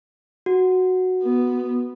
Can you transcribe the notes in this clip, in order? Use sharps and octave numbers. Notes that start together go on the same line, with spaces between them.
F#4
B3